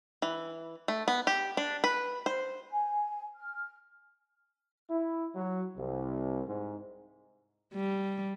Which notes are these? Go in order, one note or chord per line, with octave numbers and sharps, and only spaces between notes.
E3
A3
B3
G4
D4
B4
C5
G#5
F6
E4
F#3
C2
G#2
G3